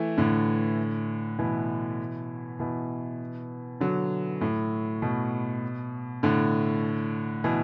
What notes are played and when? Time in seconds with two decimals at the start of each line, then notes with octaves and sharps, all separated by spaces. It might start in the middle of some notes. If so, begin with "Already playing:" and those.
Already playing: E3 A3
0.18 A2 D3
1.39 B2 E3
2.59 B2 E3
3.80 D3 F#3
4.41 A2
5.02 B2
6.23 A2 D3
7.44 B2 E3